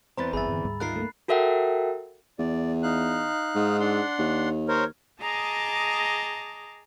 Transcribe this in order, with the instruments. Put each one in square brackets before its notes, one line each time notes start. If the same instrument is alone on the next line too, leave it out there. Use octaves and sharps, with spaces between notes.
[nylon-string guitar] E2 E3 C4 [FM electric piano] C5 B5 A6 [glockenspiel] A#5
[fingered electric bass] G#1 G2 [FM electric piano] G#4 E5 [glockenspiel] B5 A6
[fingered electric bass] G2 D3 D#3
D2 G#2 G3
[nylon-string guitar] D#3 F4 A#4 [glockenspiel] F#6 C7
[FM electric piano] A3 A#3
[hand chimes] F#4 A4 A#4 E5 F#5 G5
[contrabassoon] E2 [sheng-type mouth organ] D5
[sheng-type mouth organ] D#4 F5 F#6
[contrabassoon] G#2
[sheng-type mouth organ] D4 F#5 C6
[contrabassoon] D#2
[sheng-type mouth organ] A#4 C5 C#5
[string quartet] G#4 D#5 A5 A#5 D6